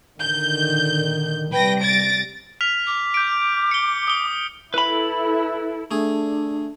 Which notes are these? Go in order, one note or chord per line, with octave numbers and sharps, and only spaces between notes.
A#2 D3 D#3 G6
C3 G3 B4 G5 A#6
A6 A#6 D7
F6 B6 F7
D6
G6 D7
C#7 G7
D#6 G7
E4 A4 B4 B5
A3 D4 G#4